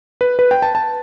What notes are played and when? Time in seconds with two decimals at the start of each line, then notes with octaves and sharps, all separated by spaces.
0.21 B4
0.39 B4
0.51 G5
0.62 A5
0.75 A5